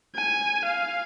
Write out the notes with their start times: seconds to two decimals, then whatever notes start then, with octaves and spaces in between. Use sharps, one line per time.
0.15 G#5
0.65 F5